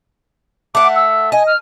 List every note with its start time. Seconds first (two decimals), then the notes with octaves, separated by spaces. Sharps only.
0.75 A3 F#5 D6
0.96 E6
1.32 D#5 G#5
1.47 F6